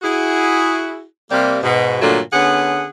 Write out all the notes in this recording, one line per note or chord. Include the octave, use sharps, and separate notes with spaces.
E4 F#4 G#4
C3 G3 A#3
G#2 B2
G2 A#2 D3 F#3 A3 D4
D3 B3 C#4 G#4 F#5